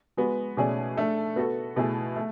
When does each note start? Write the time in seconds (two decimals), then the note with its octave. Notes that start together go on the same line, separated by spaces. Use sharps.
0.17 G#3 B3 F#4
0.57 B2 A3 C#4 G#4 D5
0.97 A3 D4 A4 E5
1.36 B3 F#4 A4
1.76 B2 A3 E4 G#4
2.16 A3